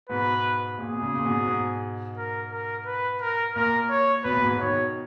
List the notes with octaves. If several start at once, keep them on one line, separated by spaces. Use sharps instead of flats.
G#2 B2 B4
A#2 G#4
B2
A#2 C#3
A#2
G#2 B2
G#2 B2
A#4
A#4
B4
A#4
A#2 A#4
C#5
B2 B4
A#2
G#2 B2
B2 D#3 C#5